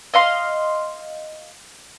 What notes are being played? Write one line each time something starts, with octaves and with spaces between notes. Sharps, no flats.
D#5 F5 C6